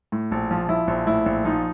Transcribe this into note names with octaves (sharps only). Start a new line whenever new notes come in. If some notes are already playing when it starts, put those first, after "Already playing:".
A2
A#1
F3
F3 E4
A#1
A2 E4
A#1
F3 D#4